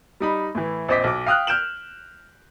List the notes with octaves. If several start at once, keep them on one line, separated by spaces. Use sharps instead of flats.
G3 D#4 B5
A2 E3
A#1 C4 C5 D#5 D6 B6
B1 D6
F5 G5 D#6 F6 F#6
F6 G6 D7 E7 F#7